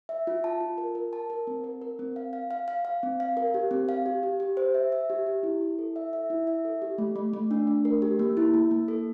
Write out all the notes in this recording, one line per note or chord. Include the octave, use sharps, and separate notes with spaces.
E5
F4
A5
F4
A#4
A#4
A5
A#4
C4
A#4
A#4
C4
F5
F5
F5
F5
F5
C4
F5
A#4
G4
C4
F5
G4
G4
G4
C5
E5
E5
G4
G4
E4
E4
A4
E5
E5
E4
E5
A4
G4
A3
A3
A3
D4
A3
A#4
G4
A#3
E4
A#3
A#3
A4